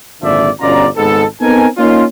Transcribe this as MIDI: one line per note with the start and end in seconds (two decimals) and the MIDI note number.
0.22 0.49 32
0.22 0.49 46
0.22 0.49 50
0.22 0.49 53
0.22 0.49 74
0.22 0.49 76
0.61 0.86 31
0.61 0.86 47
0.61 0.86 61
0.61 0.86 65
0.61 0.86 74
0.61 0.86 82
0.97 1.24 32
0.97 1.24 37
0.97 1.24 44
0.97 1.24 59
0.97 1.24 69
1.41 1.66 59
1.41 1.66 60
1.41 1.66 63
1.41 1.66 69
1.41 1.66 70
1.41 1.66 80
1.78 2.04 58
1.78 2.04 61
1.78 2.04 63
1.78 2.04 65